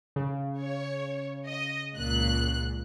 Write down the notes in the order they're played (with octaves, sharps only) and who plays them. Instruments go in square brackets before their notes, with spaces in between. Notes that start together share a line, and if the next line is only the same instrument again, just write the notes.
[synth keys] C#3
[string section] C#5
D#5
C#2 A#2 F#6